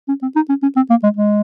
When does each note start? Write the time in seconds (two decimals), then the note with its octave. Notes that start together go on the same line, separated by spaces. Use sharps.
0.09 C#4
0.22 C4
0.36 D#4
0.49 C#4
0.63 C#4
0.76 C4
0.90 A#3
1.03 G#3
1.17 G#3